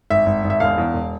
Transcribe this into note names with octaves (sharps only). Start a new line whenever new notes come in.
G#1 E5
G#1
G#1
E5
E1 F5
E2
E1